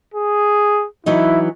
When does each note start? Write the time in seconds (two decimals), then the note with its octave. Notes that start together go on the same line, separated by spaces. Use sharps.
0.14 G#4
1.06 E3 F#3 D#4 E4